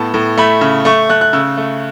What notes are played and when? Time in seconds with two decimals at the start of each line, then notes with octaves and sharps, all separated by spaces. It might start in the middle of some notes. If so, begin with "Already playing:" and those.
Already playing: A2 B3 A5
0.14 A2
0.37 A3 B5
0.61 C#3
0.85 A3 C#6
1.09 A3 F#6
1.21 F#6
1.33 C#3 E6
1.57 A3